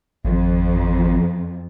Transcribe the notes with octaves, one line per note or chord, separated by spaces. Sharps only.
G#1 F2